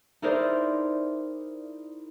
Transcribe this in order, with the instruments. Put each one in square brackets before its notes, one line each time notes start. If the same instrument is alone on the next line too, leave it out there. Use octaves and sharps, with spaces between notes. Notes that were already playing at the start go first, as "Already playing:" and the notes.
[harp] D#4 E4 G#4 A#4 C5 D5